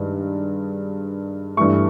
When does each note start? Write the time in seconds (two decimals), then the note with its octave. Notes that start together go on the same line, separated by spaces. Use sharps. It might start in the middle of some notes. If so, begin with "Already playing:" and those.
Already playing: G2 D#3 G#3
1.57 G2 E3 A3 C#6